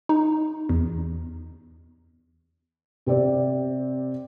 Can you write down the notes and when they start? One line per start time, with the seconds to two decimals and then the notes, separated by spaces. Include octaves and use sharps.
0.09 D#4
0.69 E2
3.06 C3 C4 D5